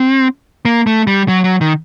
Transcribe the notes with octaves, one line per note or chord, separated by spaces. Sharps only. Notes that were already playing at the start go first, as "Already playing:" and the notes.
Already playing: C4
A#3
A3
G3
F#3
F#3
D#3